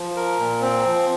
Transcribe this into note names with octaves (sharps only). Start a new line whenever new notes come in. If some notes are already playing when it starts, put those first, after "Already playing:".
Already playing: F3
A#4
A#2
C4
F3